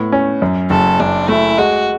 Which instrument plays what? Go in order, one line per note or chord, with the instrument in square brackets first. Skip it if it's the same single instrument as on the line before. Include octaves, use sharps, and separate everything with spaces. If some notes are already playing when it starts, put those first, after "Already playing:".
Already playing: [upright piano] A2 B3
C#4
F#2
[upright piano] F#1 [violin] A4
[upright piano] F#2 [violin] D4
[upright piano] A3 [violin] E4
[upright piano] G#3 [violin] F#4